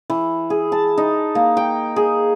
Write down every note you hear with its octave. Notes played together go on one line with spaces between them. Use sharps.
E3
G#4
A5
D#4
A#3
G5
G#4